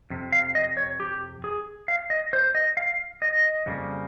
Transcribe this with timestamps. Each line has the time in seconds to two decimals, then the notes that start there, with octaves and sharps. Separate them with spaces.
0.10 F2 C3
0.32 F5
0.55 D#5
0.77 C#5
1.00 G4
1.44 G#4
1.88 F5
2.10 D#5
2.33 C5
2.55 D#5
2.77 F5
3.22 D#5
3.66 F2 C#3 G3 A#3